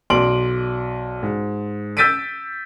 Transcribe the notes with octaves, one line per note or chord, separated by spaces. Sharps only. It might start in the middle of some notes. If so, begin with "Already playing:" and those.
B1 D5 C6 D7 F#7
G#2
E6 G6 A6 B6 D7 D#7